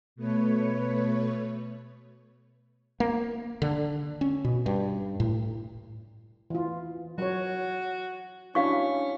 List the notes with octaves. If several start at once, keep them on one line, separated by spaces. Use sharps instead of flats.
B2 A3 B4 C#5
A#3
D3
C#4
B2
G2
A2
E3 F4
F#3 F#4 C#5
C#4 D4 E4 F#4 F5 C#6